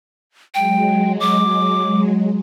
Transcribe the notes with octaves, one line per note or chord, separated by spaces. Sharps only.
F#3 G#3 G5
D6